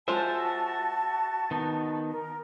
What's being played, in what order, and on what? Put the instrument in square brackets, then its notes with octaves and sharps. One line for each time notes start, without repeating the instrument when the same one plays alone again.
[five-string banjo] G#3 F4 C5 [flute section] F#4 A5 [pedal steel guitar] E5
[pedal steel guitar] D#3 B3 D#4
[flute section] A#4